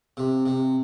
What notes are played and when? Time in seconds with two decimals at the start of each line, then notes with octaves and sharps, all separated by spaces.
0.17 C3
0.46 C3